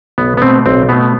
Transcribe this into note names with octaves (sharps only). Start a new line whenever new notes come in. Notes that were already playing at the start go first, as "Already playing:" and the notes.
B1 B3
B3
B2 A3 C4
B1 C4
B2 A3 B3